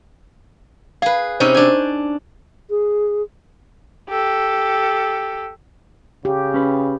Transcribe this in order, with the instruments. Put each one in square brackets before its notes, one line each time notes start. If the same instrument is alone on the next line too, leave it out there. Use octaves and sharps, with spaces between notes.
[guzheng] G#4 B4 [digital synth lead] F5
[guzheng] C3 C#4 D#4 [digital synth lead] C5
[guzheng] D4 G#5
[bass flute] G#4
[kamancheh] G4 A4
[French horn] C#3 [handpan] G4
[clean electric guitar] C#4 B4